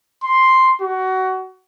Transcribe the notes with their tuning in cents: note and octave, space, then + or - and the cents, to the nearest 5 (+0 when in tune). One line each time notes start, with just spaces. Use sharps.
C6 +0
F#4 +20